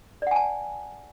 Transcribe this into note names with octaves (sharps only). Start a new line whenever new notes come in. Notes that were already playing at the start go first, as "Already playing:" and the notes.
D5 F#5 G#5 A5